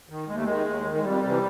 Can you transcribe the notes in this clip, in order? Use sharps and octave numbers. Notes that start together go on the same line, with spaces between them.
D#3
D#2 G#3
A3
D#3 G#3
D#2
D#3
G#3
F2 G3
C3 E3